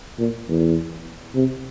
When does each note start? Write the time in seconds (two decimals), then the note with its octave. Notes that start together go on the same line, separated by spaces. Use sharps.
0.19 A#2
0.49 E2
1.35 C3